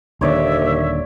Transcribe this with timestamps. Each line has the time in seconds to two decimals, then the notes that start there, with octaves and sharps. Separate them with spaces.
0.21 D#1 D#2 D3 D#3 C#5 D5 E5